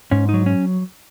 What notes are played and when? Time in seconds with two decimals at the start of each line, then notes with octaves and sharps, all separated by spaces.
0.11 G#2 C#4
0.29 F#3 D#4
0.46 C#4